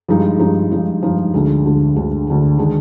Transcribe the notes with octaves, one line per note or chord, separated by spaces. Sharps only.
G2 F3 G#3 D#4
G2 F3 G#3 D#4
G2 F3 G#3 D#4
G2 F3 G#3 D#4
D2 D3 G#3
D2 D3 G#3
D2 D3 G#3
D2 D3 G#3
D#3 G#3 D4